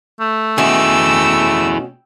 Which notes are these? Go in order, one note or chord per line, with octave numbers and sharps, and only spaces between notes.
A3
B2 C#4 E4 G#4 G5 E6